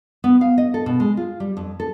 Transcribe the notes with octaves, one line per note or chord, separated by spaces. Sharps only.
B3
F5
D#5
A4
B2
G#3
F4
G3
F2
A4